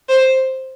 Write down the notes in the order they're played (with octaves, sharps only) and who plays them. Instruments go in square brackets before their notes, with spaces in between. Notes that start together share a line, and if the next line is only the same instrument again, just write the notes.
[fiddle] C5